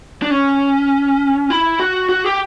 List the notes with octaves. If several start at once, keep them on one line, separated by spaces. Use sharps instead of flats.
D4
C#4
E4
F#4
F#4
G4